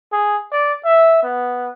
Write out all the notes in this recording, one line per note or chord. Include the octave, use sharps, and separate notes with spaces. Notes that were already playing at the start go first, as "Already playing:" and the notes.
G#4
D5
E5
B3